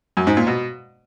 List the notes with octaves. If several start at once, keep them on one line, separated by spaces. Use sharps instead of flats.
F#2
G#2
A#2
B2